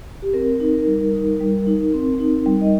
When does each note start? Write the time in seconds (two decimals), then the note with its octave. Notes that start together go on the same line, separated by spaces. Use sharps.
0.22 G4
0.34 C4 A#4
0.60 D#4
0.74 A#4
0.86 G3
1.13 D#4
1.41 G3
1.67 D#4
1.94 C4
2.19 D#4
2.46 G3
2.61 D#5